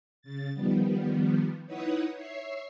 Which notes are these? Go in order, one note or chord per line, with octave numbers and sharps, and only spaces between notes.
C#3 A6
D#3 F3 G3 B3
D#4 E4 B4 C#5 F#5 D#6
C#5 E5 C7